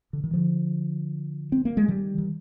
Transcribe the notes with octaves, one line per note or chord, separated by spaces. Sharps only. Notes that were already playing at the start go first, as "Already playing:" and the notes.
D3
D#3
D3 F3
C4
A#3
G#3
D#3 G3
D#3